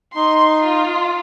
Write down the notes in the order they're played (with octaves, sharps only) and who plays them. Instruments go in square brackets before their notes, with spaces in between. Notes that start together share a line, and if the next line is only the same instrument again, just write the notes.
[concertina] D#4 [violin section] C6
[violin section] F4